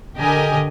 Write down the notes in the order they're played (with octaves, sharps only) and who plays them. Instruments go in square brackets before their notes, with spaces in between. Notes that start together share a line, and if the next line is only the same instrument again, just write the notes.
[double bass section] D3 [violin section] G4 A#4 D#5 G#5